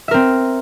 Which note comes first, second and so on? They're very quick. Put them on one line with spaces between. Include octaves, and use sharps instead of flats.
E5 A#4 C4